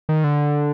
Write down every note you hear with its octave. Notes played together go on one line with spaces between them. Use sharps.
D#3
D3